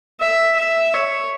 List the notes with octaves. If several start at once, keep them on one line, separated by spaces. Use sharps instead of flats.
E5
E5
C#5